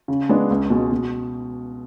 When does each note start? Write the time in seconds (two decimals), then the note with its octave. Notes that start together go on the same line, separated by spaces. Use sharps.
0.08 C#3
0.29 G#3 B3 D4
0.50 C#2
0.70 B2 G#3
0.92 B2